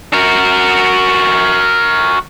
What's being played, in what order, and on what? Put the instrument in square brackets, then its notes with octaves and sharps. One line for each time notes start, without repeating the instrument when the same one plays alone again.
[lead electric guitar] F#4 A#4